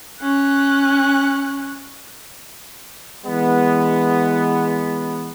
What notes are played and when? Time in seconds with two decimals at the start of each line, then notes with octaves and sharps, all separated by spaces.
0.21 C#4 F#6
3.26 E3 G#3 B3